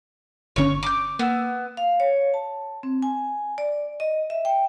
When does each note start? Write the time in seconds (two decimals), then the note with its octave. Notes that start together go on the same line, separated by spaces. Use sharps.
0.56 G1 D3 C#4 C#5 C#6
0.83 D6 G6
1.19 A#3 B3 E6
1.77 F5
2.00 C#5
2.34 A5
2.83 C4
3.02 G#5
3.58 D5
4.00 D#5
4.30 E5
4.45 G5